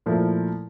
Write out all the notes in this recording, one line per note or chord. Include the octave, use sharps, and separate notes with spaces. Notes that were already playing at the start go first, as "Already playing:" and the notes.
A#2 F3 A3 E4 A#4